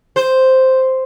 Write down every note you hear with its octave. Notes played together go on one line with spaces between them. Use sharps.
C5